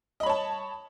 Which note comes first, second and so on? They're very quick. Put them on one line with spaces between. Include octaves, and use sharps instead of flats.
D#5 B5 C#5 A5